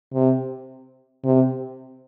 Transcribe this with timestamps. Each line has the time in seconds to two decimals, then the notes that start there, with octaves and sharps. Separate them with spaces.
0.13 C3
1.24 C3